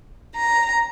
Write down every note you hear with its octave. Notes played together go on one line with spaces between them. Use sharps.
A#5